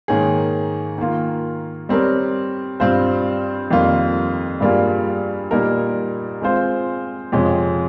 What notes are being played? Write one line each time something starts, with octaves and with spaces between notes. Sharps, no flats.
G#2 D#3 A#3 C#4 G#4
D#3 A#3 F4
G3 C4 G4 A#4 C#5
G2 G3 C4 F4 C5
F2 D#3 G3 A#3 F4
G2 G3 A#3 F4 G#4
A#2 G3 A#3 D#4 A#4
G#3 C4 F4 C5
F2 C3 F3 G#3 C#4